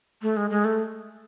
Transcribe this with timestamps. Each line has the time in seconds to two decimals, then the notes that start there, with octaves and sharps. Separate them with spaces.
0.22 A3
0.37 G#3
0.50 G#3
0.65 A3